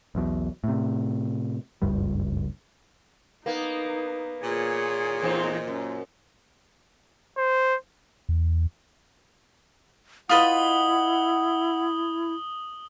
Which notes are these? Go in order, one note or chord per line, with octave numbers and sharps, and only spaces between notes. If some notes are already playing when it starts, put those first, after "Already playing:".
B1 E2 B2
A2 C3
F#1 C#2 G2 G3
A#3 B3 D#4
A#2 G#4 C#5
E2 D#4 C5
F#2
C5
E2
E4 F4 B4 D#5 F#5 D#6 F#7 G7